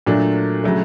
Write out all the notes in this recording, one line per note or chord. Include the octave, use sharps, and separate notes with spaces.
A#2 F#3 A3 D4
C#3 F#3 A3